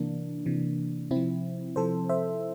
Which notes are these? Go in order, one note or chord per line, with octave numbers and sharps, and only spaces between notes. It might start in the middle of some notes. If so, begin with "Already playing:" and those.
Already playing: C3 E3 A#3 D4
C3 E3
C3 C4 E4
F3
C3 F3 A4 C5
C5 E5